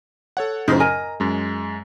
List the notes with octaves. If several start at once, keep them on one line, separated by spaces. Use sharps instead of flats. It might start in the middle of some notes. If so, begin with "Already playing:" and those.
A4 C#5 F#5
F#2 A2 C#3 D#4 F4 C5
A#4 D#5 G#5 A#5
F#2 G#3